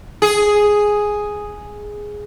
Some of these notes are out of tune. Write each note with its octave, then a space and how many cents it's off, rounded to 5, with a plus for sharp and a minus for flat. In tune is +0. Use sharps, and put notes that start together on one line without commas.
G#4 +0